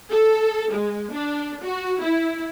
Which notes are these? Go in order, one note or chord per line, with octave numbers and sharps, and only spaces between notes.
A4
G#3
D4
F#4
E4